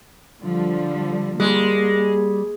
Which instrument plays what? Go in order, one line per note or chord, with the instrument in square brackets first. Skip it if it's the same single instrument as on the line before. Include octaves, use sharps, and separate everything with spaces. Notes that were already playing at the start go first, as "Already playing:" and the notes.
[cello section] D3 F3 G3
[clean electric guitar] G3 [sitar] G#3 [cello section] A#3